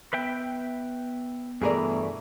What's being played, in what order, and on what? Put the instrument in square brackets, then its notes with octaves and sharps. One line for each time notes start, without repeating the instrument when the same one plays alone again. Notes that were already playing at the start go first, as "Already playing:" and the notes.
[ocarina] B3 [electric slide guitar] B4 E5 G5
[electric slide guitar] G2 B2 E3 [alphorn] A3 [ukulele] G#4 A#4 D5